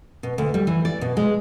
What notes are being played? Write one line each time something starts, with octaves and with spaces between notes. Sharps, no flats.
B2
D2
G3
E3
D5
B2
G#3